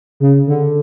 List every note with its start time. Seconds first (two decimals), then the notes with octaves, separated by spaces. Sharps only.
0.20 C#3
0.47 D3